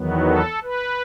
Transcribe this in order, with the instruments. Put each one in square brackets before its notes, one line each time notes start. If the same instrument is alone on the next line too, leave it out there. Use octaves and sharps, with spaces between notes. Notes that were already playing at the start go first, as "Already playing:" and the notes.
Already playing: [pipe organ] E2 D#3 F#3 B3
A4
B4